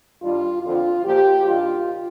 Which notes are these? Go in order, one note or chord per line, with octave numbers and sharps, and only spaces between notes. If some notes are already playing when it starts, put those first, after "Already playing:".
G2 D#3 G3 F4
F2 D3 F3 F4
A#2 F3 G4
G2 D#3 G3 F4